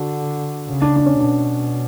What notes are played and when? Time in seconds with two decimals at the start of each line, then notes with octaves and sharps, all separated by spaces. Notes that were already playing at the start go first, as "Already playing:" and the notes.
Already playing: D3 D4 F#4
0.68 C#3
0.82 D4
0.96 D4
1.06 C#4
1.20 B2 D4